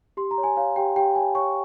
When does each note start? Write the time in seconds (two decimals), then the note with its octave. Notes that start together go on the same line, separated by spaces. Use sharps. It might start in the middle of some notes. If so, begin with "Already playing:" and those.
0.17 G4 C6
0.31 A#5
0.38 C#5
0.43 G#5
0.57 C#5 F5
0.76 G4 G5
0.96 G4 G5
1.15 C#5 G#5
1.35 C#5 C#6